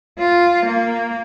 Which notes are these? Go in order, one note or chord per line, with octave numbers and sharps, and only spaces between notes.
F4
A#3